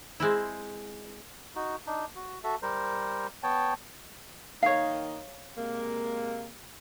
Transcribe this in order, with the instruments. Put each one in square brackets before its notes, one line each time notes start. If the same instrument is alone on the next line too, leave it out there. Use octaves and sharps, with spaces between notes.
[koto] G#3 C4 E4
[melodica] D#4 F#4
D4 D#4
F#4
F#4 A4 E5
G3 A#4 C5
B3 C#5 G5 A5
[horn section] D#3 A#3 D#4 [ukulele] C#5 F5
[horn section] C3 G#3 A#3